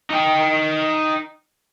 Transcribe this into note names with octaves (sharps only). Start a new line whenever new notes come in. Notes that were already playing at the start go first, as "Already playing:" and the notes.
D#4 G5